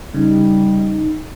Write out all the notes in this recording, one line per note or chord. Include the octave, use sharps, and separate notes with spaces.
C#3 G3 D#4